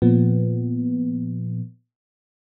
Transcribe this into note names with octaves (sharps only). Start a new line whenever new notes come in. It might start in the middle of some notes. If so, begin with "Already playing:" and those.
A#2 F3 B3